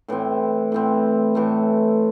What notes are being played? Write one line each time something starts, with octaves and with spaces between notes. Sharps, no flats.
A2 E3 C4
A2 E3 C4
A2 E3 A3